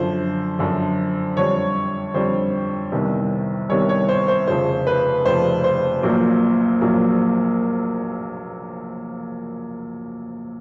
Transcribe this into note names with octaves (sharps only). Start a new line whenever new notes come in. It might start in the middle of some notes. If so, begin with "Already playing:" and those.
Already playing: F#2 D3 F3 C5
F#2 D3 F3
F2 D3 G3 C4 C#5
F2 D3 G3 C4 C5
C2 C3 D#3 G3 B3
C2 C3 D#3 G3 B3 C#5
C#5
C5
C5
F1 F2 C#3 F3 C5
B4
F1 F2 C#3 F3 C5
C5
A#1 A#2 F#3 A#3
A#1 A#2 F#3 A#3